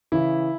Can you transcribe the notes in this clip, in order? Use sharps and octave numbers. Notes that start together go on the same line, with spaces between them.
C#3 E3 E4